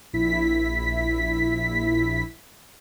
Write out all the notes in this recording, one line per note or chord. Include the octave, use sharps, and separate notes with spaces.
A#1 E4 B6